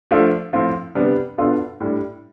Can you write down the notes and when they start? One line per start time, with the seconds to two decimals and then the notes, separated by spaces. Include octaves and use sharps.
0.11 F3 A3 D4 F4 A4
0.53 A2 F3 C4 F4
0.95 C3 G3 B3 D4
1.38 B2 B3 D4 F4 A4
1.80 A2 G3 D4